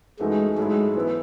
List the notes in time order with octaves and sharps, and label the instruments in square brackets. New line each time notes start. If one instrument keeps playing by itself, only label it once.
[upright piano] F#2 E3 A3 D#4 F#4 [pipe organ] G#3
[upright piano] G#2 F#3 A3 E4 [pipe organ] G#3
[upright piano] E3 B3 E4